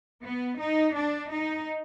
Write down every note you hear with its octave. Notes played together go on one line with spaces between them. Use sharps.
B3
D#4
D4
D#4